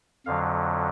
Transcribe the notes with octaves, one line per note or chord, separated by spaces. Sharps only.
F2 D3 F#3 F5